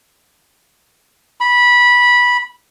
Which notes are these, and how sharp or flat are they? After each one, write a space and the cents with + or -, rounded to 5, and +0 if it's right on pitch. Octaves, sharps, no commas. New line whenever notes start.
B5 -15